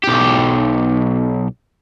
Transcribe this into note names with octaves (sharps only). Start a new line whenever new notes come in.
B1 G4